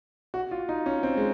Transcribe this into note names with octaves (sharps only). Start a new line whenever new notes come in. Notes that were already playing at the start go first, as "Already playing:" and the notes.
F#4
F4
D#4
C#4
C4
G#3